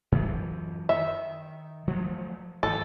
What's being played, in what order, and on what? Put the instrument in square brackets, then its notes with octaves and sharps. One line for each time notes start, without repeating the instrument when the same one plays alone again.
[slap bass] F#2 E3 F3
[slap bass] D#3 [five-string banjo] E5
[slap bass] F3 F#3 A3
[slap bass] G#1 F3 [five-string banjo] A4